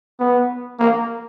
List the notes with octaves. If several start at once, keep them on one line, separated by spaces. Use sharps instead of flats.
B3
A#3